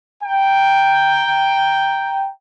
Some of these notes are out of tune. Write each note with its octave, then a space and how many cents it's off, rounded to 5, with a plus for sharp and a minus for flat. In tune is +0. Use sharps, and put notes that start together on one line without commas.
G5 +0 A#5 +0